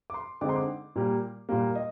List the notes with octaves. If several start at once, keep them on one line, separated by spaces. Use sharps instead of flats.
D6
C6
D3 G#3 C4 D#4 D6
C6
D6
A#2 G3 A#3
A#2 G3 A#3 F5
D#5